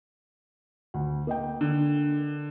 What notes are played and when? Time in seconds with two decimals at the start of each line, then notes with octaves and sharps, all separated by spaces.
0.94 D2
1.27 A#3 D#5 G5
1.61 D3